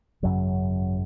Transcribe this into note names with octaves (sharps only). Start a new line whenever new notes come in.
G#1 F#2 C#3 F#3